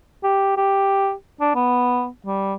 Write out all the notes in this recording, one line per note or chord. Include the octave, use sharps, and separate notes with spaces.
G4
G4
D4
B3
G3